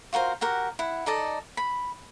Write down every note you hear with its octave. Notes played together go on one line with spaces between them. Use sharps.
F4 F#4 A#4 C5
F#4 G4 A#4 F#5
E4 F#5
D#4 A4 D5 D#5
B5